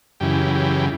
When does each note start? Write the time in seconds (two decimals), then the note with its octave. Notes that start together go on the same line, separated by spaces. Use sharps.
0.20 F#2 C#3 E3 G4
0.55 G4